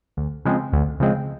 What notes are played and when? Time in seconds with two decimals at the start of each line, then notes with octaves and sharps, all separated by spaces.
0.17 D2
0.45 C#3 F3 G#3 C4
0.73 D2
1.00 C#3 F3 G#3 C4